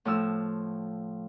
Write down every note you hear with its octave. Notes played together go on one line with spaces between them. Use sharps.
A2 F3 E6